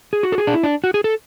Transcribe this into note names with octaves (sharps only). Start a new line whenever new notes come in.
G#4
F#4
A4
G#4
D4
E4
D4
F#4
G#4
A4